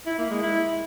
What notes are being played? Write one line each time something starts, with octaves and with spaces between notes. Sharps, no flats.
E4
A#3
G#3
E4